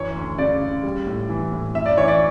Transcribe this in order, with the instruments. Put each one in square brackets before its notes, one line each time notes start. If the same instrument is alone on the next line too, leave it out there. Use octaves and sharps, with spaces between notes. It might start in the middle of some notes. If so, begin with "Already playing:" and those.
Already playing: [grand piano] F#2 E3 C#5
D2
C#3 D5
C#3
G3
A2
E3
A2
F#2 E5
D5
E3 C#5
D5